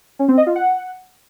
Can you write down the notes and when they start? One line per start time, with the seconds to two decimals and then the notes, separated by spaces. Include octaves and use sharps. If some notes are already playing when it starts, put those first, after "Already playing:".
0.19 C#4
0.28 C4
0.37 D#5
0.47 F4
0.56 F#5